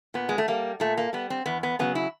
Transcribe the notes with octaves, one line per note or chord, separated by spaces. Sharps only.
A#2 B3
G#3
A3
G3 A#3
A#2 A3
A#3
G3 B3
C4
E2 B3
B3
C#3 F#3 B3
E4